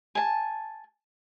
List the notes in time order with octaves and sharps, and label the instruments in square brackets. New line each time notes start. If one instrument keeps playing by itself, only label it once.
[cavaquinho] G#5 A5